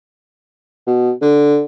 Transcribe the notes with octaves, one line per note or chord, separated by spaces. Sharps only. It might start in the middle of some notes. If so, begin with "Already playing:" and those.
B2
D3